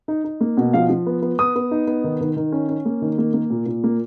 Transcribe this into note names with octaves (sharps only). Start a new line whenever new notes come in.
D#4
D#4
A#3
B2
F3 F5
F3
B3
B3
B3 D#6
B3
D#4
B3
D#3
D#3
D#3
C#4
C#4
A#3
D#3
A#3
A#3
A#2
A#2
A#3